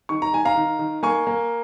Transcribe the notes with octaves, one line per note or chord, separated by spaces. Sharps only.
D#3 C#6
A#5
D#3 G#5
F5 A#5
D#3
D#3
A#3 G#5 C#6
A#3